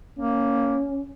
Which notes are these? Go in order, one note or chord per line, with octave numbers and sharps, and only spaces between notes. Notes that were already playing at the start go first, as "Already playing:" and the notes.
A#3 C#4